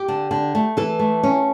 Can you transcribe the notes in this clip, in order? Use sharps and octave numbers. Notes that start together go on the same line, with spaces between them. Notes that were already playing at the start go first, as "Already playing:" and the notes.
Already playing: G4
D3
D3
A3
E3 A4
A3
C#4